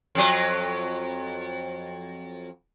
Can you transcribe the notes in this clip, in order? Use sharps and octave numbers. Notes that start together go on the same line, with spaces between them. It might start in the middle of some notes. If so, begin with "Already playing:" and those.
F2 F#3